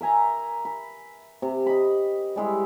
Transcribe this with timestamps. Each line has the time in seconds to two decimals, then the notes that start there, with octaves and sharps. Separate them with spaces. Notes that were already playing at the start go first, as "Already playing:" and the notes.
0.01 A#4 E5 G#5 A#5
0.65 B5
1.42 C3
1.66 D#5 B5
2.36 G3 G#3 E4